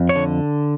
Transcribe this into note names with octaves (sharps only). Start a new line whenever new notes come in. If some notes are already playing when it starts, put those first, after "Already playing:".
Already playing: F2
C#5
D3